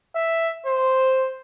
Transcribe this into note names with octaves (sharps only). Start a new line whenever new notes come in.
E5
C5